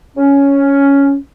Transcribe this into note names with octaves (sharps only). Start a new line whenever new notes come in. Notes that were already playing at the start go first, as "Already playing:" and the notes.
C#4